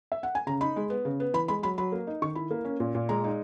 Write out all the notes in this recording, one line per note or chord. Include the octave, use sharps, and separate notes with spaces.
E5
F#5
G#5
C#3 A#5
D#4 B5
G#3
B3
C#3
B3
E3 B5
G#3 B5
F#3 B5
F#3 B5
A#3
D#4
D#3 C#6
E4 B5
A#3
C#4
A#2
A#2
G#3 A#5
D#4